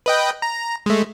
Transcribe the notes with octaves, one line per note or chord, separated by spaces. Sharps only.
B4 D#5 G5
A#5
G#3 A3